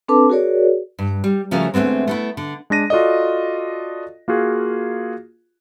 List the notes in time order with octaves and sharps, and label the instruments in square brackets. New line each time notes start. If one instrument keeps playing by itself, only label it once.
[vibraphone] C4 D4 A4 B4 A5 D6
F#4 G#4 A#4 C#5 D5
[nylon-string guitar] G2
G3
C#3 F3 A3 C#4 F#4 A#4
D2 G#3 A3 B3 C4
A3 B3 E4
D3
[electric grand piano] G#3 D4 A#6 D#7
F4 F#4 A4 D5 D#5
A#3 F4 F#4 G#4